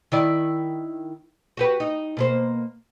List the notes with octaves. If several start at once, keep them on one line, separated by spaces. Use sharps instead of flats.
D#3 E4 D5
F#4 G4 B4
D#4
B2 A#3 C5